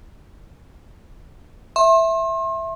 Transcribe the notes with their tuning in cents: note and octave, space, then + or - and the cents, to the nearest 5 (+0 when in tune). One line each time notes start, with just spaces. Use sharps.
E5 +0 C6 +40